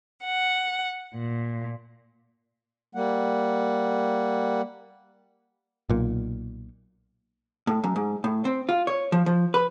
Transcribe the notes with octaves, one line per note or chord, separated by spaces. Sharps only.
F#5
A#2
G3 A#3 F#5
B1 A#2
A2
F#2
G#2
A2
C4
F4
C#5
F3
F3
B4